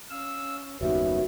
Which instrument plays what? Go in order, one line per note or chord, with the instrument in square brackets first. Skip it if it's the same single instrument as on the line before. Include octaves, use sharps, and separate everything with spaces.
[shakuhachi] C#4 [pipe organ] F5 E6
[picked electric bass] F#1 D#2 D#3 [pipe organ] G3 B3 C#4 [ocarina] F#4 [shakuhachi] E5